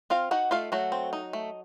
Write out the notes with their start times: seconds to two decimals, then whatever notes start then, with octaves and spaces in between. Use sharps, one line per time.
0.10 C4 F4 F5
0.31 D#4 F#4 F#5
0.51 A3 F4 F5
0.72 F#3 A3 F#4
0.92 C4
1.13 D#4
1.33 A3